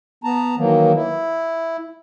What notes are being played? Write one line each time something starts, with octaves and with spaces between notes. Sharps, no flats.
B3 A5 A#5
D#3 E3 F#3 A#3
E4